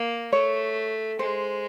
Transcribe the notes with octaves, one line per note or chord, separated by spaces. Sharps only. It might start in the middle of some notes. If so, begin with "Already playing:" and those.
Already playing: A#3
A3 C#5
G#3 C5